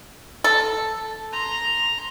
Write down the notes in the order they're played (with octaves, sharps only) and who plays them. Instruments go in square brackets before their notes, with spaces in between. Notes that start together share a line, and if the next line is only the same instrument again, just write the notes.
[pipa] A4
[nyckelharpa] A#5 C6